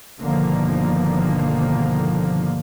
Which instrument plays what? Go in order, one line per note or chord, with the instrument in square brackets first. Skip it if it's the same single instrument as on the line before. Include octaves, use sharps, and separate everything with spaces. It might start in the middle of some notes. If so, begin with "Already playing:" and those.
[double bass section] G1 B2 D3 D#3 F3 A#3